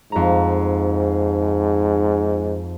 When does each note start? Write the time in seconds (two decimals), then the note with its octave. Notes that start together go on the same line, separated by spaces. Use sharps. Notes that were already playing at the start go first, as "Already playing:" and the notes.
0.12 F2 G#2 A#5